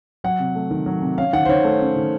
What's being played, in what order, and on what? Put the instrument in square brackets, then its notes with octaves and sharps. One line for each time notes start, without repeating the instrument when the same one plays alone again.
[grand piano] F#3 F#5
C3
A3
D#3
F#3
C3
C#4 F5
D#3 F#5
C5
D#3 C#5
A3
C#4
D#3